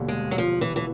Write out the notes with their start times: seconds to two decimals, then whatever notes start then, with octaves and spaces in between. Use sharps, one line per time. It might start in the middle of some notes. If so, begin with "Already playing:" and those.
Already playing: E1 D#2 D3 G3
0.08 G#3
0.31 F#3
0.38 F3
0.61 E3
0.76 E3